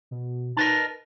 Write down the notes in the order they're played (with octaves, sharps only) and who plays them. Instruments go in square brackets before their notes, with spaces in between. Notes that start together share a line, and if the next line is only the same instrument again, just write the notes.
[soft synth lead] B2
[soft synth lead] D#4 [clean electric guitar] A#4 B4 A5